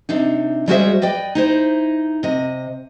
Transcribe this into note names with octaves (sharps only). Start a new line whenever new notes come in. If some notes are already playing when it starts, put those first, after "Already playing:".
C3 D4 D#4
G3 G#3 F#4 G#4 C5 E5
B4 D5 D#5 G5
D#4 E4 C5
C3 D#5